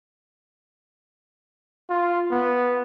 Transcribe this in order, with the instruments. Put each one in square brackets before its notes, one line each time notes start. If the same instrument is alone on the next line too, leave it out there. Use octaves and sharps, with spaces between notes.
[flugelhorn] F4
B3